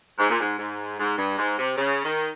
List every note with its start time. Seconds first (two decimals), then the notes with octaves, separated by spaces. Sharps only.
0.18 G#2
0.30 A#2
0.40 G#2
0.58 G#2
0.99 G#2
1.18 G2
1.38 G#2
1.58 C3
1.77 C#3
2.05 D#3